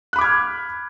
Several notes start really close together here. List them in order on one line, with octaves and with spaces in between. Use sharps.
F#6 B5 D6 G#6 F6